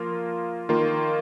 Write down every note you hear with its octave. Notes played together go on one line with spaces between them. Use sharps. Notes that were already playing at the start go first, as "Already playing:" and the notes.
Already playing: F3 A#3 F4 A#4
D#3 A#3 F4